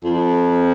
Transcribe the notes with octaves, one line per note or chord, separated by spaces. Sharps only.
F2